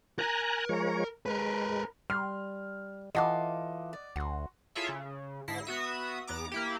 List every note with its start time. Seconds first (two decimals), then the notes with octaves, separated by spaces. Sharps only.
0.19 A#4 G#5 A#5 F#6
0.69 F3 G#3 C#5
1.26 G#3 A#4 B4
2.10 G3 C6 F6
3.15 E3 F4 A4 D#5 F5 F#5 D6
3.93 D5
4.16 D2 F#4 C6
4.75 E4 F4 G#4 A4 C#5 E5
4.89 C#3
5.48 G#2 D3 E4 A#6 C7
5.65 B3 F#4 E5 D#6
6.27 E2 B3 A#5 D6
6.52 A#3 E4 G4